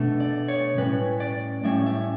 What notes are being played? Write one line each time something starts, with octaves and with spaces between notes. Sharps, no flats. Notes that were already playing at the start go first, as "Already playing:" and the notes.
Already playing: B2 A3 D4
D5
C#5
A2 G3 C#4 B4
D5
A2 G3 C#4 E5
E5